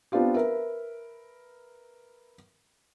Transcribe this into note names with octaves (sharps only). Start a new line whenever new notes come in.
B3 C4 D4 F4 G4
A#4 B4 E5